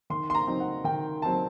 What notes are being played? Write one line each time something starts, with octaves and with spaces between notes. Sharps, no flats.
D#3 C6
C6
A#5
F#3 C4 D#4
F#5
D#3 G5
F#3 C4 D#4 A5